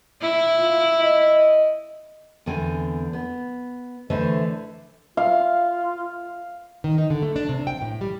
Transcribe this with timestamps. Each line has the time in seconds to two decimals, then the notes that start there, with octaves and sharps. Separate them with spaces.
0.22 E4
0.58 F4
1.00 D#5
2.46 E2 D3 C4 G#5
3.13 B3
4.10 D3 E3 A3 B4 C5 E5
5.17 F4 F5
6.84 D#3
6.98 D#4
7.10 D3
7.22 A3
7.36 D4
7.49 C3
7.67 G5
7.82 A2
8.01 G3